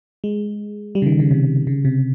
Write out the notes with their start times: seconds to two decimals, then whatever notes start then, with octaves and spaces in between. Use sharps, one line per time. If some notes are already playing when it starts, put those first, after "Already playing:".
0.24 G#3
0.95 G3
1.02 C#3
1.06 D#3
1.19 C#3
1.31 C3
1.67 C#3
1.85 C3